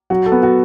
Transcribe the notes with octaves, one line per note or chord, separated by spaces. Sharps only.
F#3 F#4
A4
B3
F#4